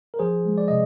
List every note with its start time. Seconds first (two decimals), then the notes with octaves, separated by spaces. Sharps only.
0.14 A#4
0.19 F3 G#4 C5
0.45 G#3
0.58 D5
0.68 C3 D#5